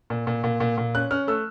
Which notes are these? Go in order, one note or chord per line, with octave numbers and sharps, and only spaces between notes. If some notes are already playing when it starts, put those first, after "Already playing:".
A#2
A#2
A#2
A#2
A#2
C#4 F#6
C#4 F6
A3 E6